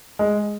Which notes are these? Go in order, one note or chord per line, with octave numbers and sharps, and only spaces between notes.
G#3